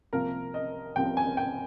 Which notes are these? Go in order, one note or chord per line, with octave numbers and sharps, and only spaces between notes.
C2 C3 F3 A#3 A#4
D#5
C2 C3 F3 A#3 G5
G#5
G5